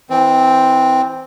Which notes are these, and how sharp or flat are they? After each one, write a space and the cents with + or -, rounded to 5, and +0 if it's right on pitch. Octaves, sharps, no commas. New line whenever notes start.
E3 -20 C4 +0